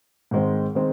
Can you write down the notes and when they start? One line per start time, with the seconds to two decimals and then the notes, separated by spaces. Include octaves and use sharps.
0.31 G#2 D#3 G#3 C4
0.75 D#3 G#3 C4